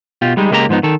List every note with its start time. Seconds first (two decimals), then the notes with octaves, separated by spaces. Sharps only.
0.22 B2 F4 G4
0.37 G3 G#3 D#4
0.51 C#2 G#3 A#3 G4 D#5 A#5
0.69 G#2 F3 B3 D#4
0.83 D#3 A4